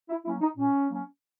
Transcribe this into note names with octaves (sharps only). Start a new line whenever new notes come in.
E4
F#3 A#3 C#4 E4
D#4
A#2 C#4
F#3 A#3 C#4